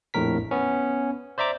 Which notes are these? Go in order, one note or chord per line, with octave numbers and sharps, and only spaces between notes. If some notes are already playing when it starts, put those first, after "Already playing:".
A#1 F2 A2 A#4 B6
B3 C#4
C5 D5 E5 A#5 D6